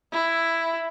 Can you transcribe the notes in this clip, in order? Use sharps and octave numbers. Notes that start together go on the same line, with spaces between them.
E4